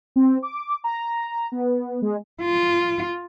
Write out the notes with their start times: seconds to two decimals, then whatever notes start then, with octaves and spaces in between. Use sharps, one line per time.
0.16 C4
0.43 D6
0.84 A#5
1.52 B3
2.02 G#3
2.41 F4